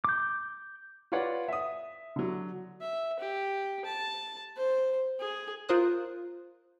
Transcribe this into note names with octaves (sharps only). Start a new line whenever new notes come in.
D6 G6
F4 B4 C#5 D5 F#5
E5 D#6
D3 F#3
E5
G4
A5
C5
G#4
F4 A#4 C5 D#6 F#6